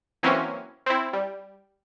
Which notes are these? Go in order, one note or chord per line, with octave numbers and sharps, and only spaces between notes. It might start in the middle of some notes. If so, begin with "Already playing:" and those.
E3 F#3 A#3 C4 C#4 E4
C4 E4
G3